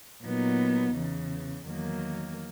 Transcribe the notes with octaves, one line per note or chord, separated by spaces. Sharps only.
A#2 F#3 B3 D#4
E2 C#3 E3
E2 D#3 F#3 A#3